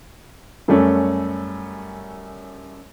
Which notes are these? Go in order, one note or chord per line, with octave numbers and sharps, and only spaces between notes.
F#2 G3 A3 C#4